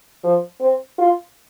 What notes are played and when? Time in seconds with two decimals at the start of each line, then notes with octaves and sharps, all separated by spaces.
0.24 F3
0.60 C4
0.98 F4